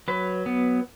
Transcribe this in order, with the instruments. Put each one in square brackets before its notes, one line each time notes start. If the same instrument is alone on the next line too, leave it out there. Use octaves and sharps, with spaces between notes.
[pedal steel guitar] F#3 B4
B3